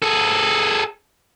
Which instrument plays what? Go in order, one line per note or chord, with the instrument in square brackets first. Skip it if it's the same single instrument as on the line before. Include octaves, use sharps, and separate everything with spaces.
[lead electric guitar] G#4 A4